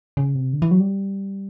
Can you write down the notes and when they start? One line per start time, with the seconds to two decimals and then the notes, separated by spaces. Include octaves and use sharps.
0.17 C#3
0.35 C3
0.53 D3
0.62 E3
0.71 F#3
0.80 G3